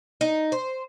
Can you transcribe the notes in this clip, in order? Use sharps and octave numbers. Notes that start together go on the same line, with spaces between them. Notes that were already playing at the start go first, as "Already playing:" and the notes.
D#4
C5